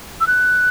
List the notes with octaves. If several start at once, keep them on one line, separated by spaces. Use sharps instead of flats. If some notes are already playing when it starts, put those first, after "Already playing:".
E6
F#6